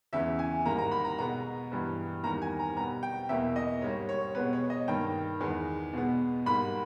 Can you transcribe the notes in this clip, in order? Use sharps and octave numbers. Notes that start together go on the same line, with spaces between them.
E2 C#3 E3 E5
G#5
G#2 D#3 G3 A#3 A#5
A#5
B5
A#5
B2 G#3 B3 A#5
G2 E3 G3 B3
E2 D#3 G3 A#3 A#5
G#5
A#5
B2 G3 B3 A#5
G5
E2 B2 A#3 E5
D#5
G#2 G3 A#3 C#5
C#5
B2 G#3 B3 B4
C#5
D#5
G2 D#3 A#3 G5
E2 D#3 G#3 B3
B2 G#3 B3
G#2 G3 A#3 B5